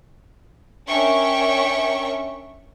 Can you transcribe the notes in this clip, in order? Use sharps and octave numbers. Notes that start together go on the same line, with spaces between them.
C#4 D4 A#4 E5 G5 C#6